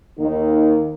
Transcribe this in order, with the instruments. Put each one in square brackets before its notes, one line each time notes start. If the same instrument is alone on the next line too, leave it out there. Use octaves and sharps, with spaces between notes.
[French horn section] D#2 D#3 A#3 D#4